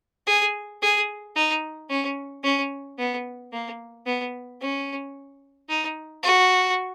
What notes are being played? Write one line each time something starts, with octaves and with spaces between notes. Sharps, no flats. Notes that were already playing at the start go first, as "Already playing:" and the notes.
G#4
G#4
D#4
C#4
C#4
B3
A#3
B3
C#4
D#4
F#4